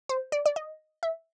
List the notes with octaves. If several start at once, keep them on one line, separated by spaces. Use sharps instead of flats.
C5
D5
D5
D#5
E5